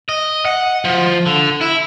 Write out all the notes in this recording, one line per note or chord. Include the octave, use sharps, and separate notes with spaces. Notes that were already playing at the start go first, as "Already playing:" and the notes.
D#5
F#5
F3
D3
E4